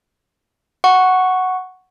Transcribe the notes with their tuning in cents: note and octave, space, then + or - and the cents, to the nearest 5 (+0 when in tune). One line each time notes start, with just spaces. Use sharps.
F#5 +0 C#6 +0